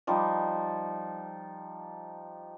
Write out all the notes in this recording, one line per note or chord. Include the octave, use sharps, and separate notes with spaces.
F3 G3 D#4